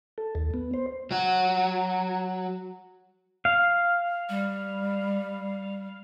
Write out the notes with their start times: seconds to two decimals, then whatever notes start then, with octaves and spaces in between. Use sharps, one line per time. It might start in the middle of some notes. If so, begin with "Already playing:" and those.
0.18 A4
0.35 D#2
0.54 B3
0.74 C5
1.11 F#3 F#4
3.45 F5
4.29 G3